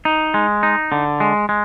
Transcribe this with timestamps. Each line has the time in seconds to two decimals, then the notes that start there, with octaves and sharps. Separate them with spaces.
0.05 D#4
0.34 G#3
0.63 D#4
0.92 D3
1.20 G#3
1.49 G#3